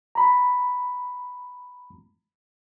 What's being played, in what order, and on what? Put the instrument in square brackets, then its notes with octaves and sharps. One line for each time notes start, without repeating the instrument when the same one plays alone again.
[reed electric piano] A#5 B5